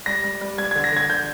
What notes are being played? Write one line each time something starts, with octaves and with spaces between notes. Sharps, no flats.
G3 A#6
G3
G3
G3 G#6
D3 G#6
A#6
D3 G#6
D3 G6